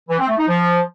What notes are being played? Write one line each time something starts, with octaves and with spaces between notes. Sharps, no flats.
E3
C4
A3
D#4
F3